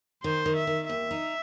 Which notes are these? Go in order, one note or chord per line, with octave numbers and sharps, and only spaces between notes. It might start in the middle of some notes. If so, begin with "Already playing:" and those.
D#3 C5
D#3
E5
D#3
D#2 E5
D#4